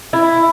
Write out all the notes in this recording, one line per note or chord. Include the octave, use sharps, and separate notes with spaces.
E4